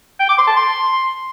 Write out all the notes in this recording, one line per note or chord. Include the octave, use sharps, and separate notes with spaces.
G5
D6
C6
A5
C6